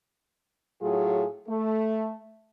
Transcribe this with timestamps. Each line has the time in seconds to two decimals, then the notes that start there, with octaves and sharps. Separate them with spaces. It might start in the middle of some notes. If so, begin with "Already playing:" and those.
0.82 A2 F#3 F4 G#4
1.49 A3